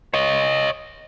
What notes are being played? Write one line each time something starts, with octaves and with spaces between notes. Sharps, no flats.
C#5 D#5